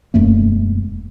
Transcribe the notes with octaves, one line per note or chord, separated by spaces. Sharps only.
E1 F#2 A3 A#3